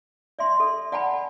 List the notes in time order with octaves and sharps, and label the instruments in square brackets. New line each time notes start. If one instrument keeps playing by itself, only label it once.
[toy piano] D5 E5 C6
A4
D5 F#5 G#5 A5 B5